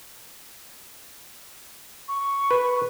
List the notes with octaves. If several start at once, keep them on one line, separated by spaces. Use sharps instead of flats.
C#6
B4